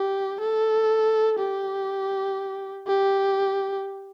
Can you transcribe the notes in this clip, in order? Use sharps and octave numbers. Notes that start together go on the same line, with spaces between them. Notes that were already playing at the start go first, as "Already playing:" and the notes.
Already playing: G4
A4
G4
G4